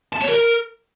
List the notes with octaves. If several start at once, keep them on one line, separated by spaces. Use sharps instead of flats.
A5
C#5
A#4